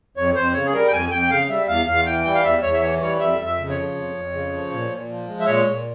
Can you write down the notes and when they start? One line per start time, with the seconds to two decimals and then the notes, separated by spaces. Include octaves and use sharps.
0.17 F2 C#5
0.35 F2 C5
0.54 C#3 C#5
0.66 G#4
0.73 G3 A#4
0.87 G5
0.92 F2 G#5
1.11 F2 G5
1.22 G5
1.30 C#3 F5
1.49 G3 E5
1.68 E2 F5
1.87 E2 F5
2.06 E3 G5
2.24 G3 G5
2.34 F5
2.43 E2 E5
2.62 E2 C#5
2.74 E5
2.81 E3 C#5
3.01 G3 C#5
3.19 F2 E5
3.38 F2
3.45 E5
3.58 C#3
3.70 C#5
3.77 F3
3.95 F2
4.14 F2
4.33 C#3
4.53 F3
4.71 A#2
4.90 A#2
5.09 F3
5.27 G#3
5.40 E5
5.46 A#2 C#5
5.66 A#2